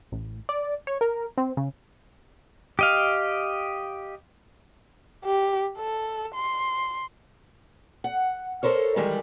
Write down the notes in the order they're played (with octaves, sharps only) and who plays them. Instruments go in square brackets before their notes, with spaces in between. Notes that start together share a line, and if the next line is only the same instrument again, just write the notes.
[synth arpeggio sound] A1
D5
C#5
A#4
C4
C#3
[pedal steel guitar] G4 D#5 F5
[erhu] G4
A4
C6
[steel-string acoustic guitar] F#5
A4 A#4 C5 C#5
D#3 E3 G3 G#3 A#4